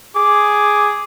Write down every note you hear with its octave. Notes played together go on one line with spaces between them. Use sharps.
G#4 D6